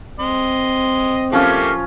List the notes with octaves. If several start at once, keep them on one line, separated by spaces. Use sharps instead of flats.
C4 D#5 C6
F3 A3 A#3 C#4 F4 G4